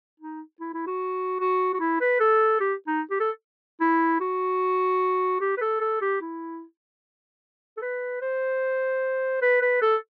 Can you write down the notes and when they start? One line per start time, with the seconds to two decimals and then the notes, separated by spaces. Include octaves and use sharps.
0.20 D#4
0.60 E4
0.74 E4
0.87 F#4
1.40 F#4
1.73 F#4
1.80 E4
2.01 B4
2.20 A4
2.60 G4
2.87 D#4
3.11 G4
3.20 A4
3.81 E4
4.20 F#4
5.41 G4
5.57 B4
5.61 A4
5.81 A4
6.01 G4
6.21 E4
7.77 A4
7.82 B4
8.21 C5
9.42 B4
9.62 B4
9.82 A4